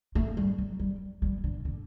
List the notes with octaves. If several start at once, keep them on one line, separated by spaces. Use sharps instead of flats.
A3
G3
F#3
G3
G3
D3
D3